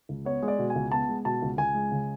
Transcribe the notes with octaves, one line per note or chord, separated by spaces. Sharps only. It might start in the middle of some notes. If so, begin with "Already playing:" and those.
C#2
B3 C#5
G#3
D5
B2
G#5
C#2
B3 A5
G#3
B2 A5
C#2
C#2 G#5
G#3
C#3